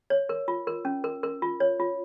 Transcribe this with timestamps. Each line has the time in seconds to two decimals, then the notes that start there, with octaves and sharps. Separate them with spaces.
0.10 C#5
0.29 A#4
0.48 F4
0.67 A#4
0.85 C#4
1.04 A#4
1.23 A#4
1.42 F4
1.60 C#5
1.80 F4